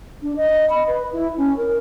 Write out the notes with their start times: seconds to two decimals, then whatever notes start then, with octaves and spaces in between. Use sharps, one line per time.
0.22 D4
0.36 D#5
0.70 B5
0.87 B4
1.12 E4
1.37 C#4
1.57 A#4